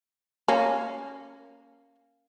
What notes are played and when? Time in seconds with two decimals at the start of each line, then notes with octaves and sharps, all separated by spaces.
0.48 A#3 C#4